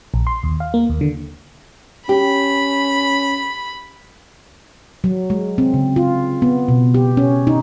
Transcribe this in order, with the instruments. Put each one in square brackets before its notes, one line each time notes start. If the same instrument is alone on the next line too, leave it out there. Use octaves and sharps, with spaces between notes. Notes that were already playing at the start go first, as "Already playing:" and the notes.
[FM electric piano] A#1
C6
D#2
F5
A#3
D#2
D3
[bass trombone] C#4 [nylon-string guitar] G4 [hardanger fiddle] B5
[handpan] F#3
G#3
C4
C#3
F4
B3
B2
G4
C#4
D#4